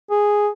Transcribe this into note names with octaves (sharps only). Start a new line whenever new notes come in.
G#4